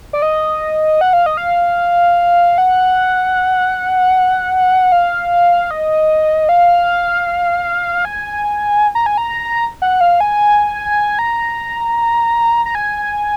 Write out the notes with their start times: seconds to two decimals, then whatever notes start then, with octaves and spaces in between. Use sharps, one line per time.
0.13 D5
0.22 D#5
1.01 F#5
1.13 F5
1.26 D#5
1.37 F5
2.58 F#5
4.92 F5
5.71 D#5
6.49 F5
8.05 G#5
8.95 A#5
9.06 G#5
9.18 A#5
9.82 F#5
10.01 F5
10.20 G#5
11.19 A#5
12.65 A#5
12.75 G#5